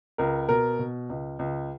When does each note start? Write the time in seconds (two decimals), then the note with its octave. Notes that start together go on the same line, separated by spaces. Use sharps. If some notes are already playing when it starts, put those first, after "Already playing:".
0.18 C#2 A#4
0.49 B2 A#4
0.79 B2
1.09 C#2
1.39 C#2